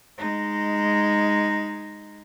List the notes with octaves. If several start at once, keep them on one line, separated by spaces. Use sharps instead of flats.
G#3 D#4